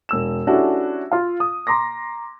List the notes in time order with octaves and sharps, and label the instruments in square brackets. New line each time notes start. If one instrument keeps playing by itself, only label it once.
[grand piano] E1 E6 E7
C#4 D4 E4 F#4 G4 A4
F4 F5
D#6
A#5 C6 D6 A#6